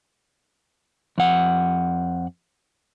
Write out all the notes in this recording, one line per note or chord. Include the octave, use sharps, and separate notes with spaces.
F2 F#5